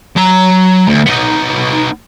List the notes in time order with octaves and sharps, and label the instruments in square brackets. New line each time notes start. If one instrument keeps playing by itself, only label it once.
[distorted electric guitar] F#3 A#5
D2
B3 D#4